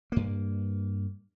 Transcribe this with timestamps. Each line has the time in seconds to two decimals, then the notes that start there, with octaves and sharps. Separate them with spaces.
0.12 G2 A#3